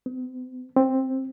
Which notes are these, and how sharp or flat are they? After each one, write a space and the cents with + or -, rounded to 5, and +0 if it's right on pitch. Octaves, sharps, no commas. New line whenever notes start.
C4 -45
C4 +10